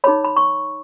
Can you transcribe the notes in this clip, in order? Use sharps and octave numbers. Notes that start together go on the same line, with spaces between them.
D#4 G#4 C#5 B5
B5
C#6